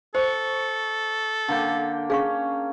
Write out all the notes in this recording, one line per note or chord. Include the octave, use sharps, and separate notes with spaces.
A4 C5 C#6
D3 A#3 G5
C#4 G#4 F5 C#6